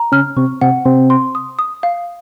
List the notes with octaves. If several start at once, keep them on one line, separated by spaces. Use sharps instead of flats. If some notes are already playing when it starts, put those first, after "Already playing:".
Already playing: A#5
C#3 C#4 F6
C3 C4 C#6
C3 C4 F#5
C3 C4 C6
C6
D#6
D#6
F5